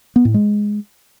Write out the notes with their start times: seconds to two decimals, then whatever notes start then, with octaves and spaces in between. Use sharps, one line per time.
0.16 B3
0.25 A2
0.34 G#3